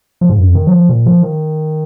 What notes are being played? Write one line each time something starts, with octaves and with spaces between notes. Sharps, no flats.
F3
G#2
F#2
F2
D#3
F#3
F3
A#2
F3
D#3